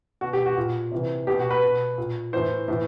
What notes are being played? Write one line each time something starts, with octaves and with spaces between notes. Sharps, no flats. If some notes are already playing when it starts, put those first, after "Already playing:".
B2 F#4
G4
F#4
A#2
C3 E3
B2 G4
F#4
B4
B2
A#2
A2 E3 C5
A2 E3